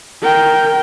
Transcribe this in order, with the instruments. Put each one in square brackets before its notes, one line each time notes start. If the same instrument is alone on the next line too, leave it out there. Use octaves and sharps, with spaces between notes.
[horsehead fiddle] A#4 G5